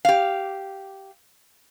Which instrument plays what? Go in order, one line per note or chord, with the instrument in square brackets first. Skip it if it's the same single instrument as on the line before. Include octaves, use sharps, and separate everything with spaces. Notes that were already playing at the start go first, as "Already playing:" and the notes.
[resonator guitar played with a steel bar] G4 F5